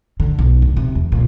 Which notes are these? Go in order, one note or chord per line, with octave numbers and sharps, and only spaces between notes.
D3
B1
D2
C3
E2
A#2